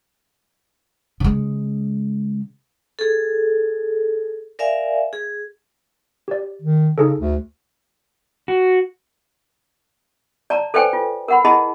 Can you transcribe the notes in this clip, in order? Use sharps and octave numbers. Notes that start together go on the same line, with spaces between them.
C#3 G#3
G#4 A4
A#4 D5 E5 F5 G#5
G#4
G4 D5
D#3
C#3 D#4 G#4 A4
D2
F#4
D5 A5 A#5
A4 B4 C5 D5 G5 G#5
F4
A#4 F#5 B5
E4 G#4 D#5 A5 B5